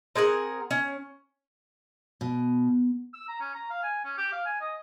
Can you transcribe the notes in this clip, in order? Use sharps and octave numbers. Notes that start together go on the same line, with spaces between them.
C4 G#4 A#4 F#5
C#4
B2
E6
A#5
C#4
A#5
F5
G#5
C#4
G4
F5
G#5
D#5